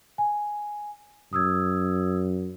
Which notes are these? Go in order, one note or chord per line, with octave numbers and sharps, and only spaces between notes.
G#5
F#2 D#6 E6 G#6